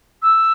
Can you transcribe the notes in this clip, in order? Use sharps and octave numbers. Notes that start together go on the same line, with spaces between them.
E6